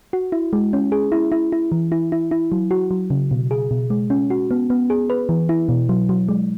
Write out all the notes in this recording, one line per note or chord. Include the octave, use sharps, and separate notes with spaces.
F#4
E4
G#3
C#4
G#4
E4
E4
E4
E3
E4
E4
E4
F#3
F#4
F#3
C#3
B2
G#4
B2
G#3
C#4
F#4
B3
B3
G#4
B4
E3
E4
B2
F#3
F#3
G#3